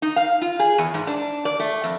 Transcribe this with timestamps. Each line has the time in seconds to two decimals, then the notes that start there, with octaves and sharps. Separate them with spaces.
0.02 D#4
0.16 F5
0.41 F4
0.59 G#4
0.78 E2
0.94 G#2
1.07 D4
1.45 D5
1.60 A3
1.84 F2